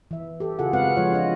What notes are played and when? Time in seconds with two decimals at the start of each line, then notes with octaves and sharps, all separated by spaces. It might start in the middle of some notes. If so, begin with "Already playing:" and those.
0.11 E3 E5
0.40 G4 A4
0.59 C#3 F4 F#4 G#4 A4 F#5
0.73 G#3 C4 B4 F5 F#5
0.96 F3 G#3 F4 C#5
1.12 D4 F4 D#5